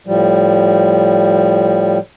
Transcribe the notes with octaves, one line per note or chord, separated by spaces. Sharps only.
A2 F3 G3